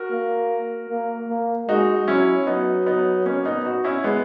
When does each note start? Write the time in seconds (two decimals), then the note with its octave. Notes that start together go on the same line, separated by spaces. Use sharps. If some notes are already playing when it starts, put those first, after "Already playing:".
Already playing: F#4 A#4
0.11 A#3
0.90 A#3
1.28 A#3
1.69 G#3 D#4 F#4
2.08 F#3 C#4 E4
2.47 F#3 B3 D#4
2.86 B3 D#4
3.26 A#3 C#4
3.45 B3 D#4
3.65 D#4 F#4
3.84 C#4 E4
4.04 G#3 B3